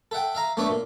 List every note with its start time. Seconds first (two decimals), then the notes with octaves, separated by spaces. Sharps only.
0.11 A4 E5 F#5 G5
0.35 E5 F5 A#5
0.57 A3 B3 D4 C#5 E5
0.69 A#2